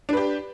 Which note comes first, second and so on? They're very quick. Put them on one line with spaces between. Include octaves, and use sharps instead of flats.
D4 B4 G4